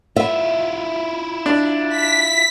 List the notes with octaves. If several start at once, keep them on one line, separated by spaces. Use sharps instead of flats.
E4 F4 E5
D4
B6